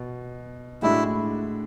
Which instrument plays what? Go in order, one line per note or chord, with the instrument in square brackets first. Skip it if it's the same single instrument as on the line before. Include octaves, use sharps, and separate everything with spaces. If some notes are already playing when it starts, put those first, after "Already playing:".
Already playing: [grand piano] B2
[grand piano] A2 G#3 D4 F#4 [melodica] E4